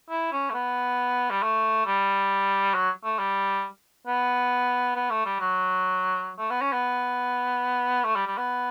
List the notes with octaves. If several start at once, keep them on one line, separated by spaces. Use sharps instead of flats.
E4
C#4
A3
B3
G3
A3
G3
F#3
A3
G3
B3
B3
A3
G3
F#3
A3
B3
C#4
B3
A3
G3
G3
B3